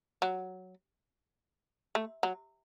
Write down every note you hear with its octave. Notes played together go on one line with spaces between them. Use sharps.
F#3
A3
F#3